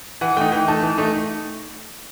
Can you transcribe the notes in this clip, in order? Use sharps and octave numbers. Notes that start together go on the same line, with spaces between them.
E3 F#5
A3 D#4 G5
E3 G5
A3 D#4 A5
E3
A3 D#4